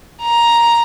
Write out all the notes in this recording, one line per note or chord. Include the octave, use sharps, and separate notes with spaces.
A#5